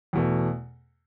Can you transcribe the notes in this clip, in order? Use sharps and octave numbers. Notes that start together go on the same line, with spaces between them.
E2 B2 A3